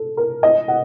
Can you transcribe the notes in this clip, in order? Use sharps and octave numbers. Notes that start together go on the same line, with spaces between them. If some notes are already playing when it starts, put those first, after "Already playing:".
Already playing: A4
A#4
D#5
F#5